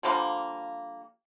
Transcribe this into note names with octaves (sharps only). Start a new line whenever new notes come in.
D3 F3 G3 A#3